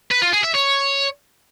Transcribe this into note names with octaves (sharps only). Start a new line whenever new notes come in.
B4
F4
G#4
E5
C#5